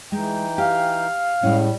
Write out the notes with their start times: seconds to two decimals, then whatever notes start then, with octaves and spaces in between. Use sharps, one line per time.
0.12 E3 G#3 D#4 G5
0.58 G4 F5
1.43 A2 G3 G#3 C#4